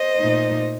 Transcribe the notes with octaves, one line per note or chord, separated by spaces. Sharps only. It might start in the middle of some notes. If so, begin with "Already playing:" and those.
Already playing: C5 D#5
A#2 A3 D#4